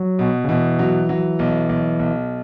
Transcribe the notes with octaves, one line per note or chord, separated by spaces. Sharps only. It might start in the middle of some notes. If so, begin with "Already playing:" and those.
Already playing: F#3
B2
C#3
B2 E3
F#3
F#3
B1
B1
B1